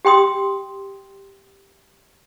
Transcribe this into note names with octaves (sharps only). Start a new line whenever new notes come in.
G4 G5 C6 D#6